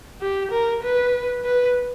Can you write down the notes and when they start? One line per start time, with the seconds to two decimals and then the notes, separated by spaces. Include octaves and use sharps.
0.21 G4
0.52 A#4
0.83 B4
1.45 B4